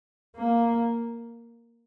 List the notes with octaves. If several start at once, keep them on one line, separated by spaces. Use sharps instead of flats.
A#3